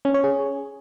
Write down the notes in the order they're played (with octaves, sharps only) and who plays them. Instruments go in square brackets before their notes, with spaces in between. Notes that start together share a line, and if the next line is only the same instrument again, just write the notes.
[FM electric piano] C#4
C#5
G#4